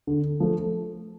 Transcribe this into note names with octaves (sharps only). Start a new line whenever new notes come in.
D3
F3 A3